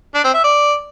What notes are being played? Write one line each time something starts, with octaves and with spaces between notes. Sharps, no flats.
D4
C4
E5
D5